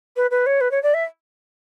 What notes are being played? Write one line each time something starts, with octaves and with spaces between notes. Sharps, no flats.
B4
B4
C#5
B4
C#5
D5
E5